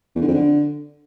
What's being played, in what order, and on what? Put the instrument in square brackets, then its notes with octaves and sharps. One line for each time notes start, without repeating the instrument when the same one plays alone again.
[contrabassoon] E2
D3
F2
D3